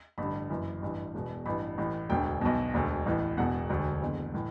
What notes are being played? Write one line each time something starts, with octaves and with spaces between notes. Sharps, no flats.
A1 G2 D3 B5
F#1 F#2 E3
A1 G2 E3
E1 E2 B2
A1 G2 E3 B5
A1 A2 E3
E1 D2 D3 G5
B1 B2
E1 D2 D3
A1 A2 E3
E1 E2 B2 F#5
E1 D2 D3
F#1 E2 D3
A2 E3